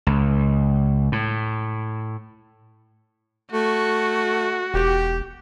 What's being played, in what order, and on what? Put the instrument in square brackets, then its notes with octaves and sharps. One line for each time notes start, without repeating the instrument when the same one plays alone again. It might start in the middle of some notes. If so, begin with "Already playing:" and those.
[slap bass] C#2
A2
[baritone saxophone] A3 [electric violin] F#4
[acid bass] E1 [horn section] G4